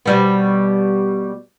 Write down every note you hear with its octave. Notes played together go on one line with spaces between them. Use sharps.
B2 G3 B3